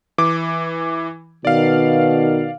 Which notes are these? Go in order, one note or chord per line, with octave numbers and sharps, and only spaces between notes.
E3 D6
B2 D#3 D5 F5